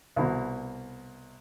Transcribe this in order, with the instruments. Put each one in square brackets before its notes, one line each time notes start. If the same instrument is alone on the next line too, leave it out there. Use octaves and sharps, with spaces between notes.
[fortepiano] C2 B2